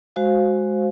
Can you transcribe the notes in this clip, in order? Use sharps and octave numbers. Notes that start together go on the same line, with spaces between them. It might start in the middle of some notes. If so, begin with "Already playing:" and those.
G#3 F#4 C5 F5